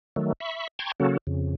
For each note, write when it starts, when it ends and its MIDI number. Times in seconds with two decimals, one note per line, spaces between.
0.16 0.33 51
0.16 0.33 54
0.16 0.33 57
0.40 0.67 76
0.40 0.67 83
0.40 0.67 85
0.79 0.92 79
0.79 0.92 81
0.79 0.92 82
0.79 0.92 84
0.79 0.92 85
0.79 0.92 92
1.00 1.17 49
1.00 1.17 54
1.00 1.17 58
1.00 1.17 61
1.00 1.17 66
1.00 1.17 69
1.27 1.55 41
1.27 1.55 49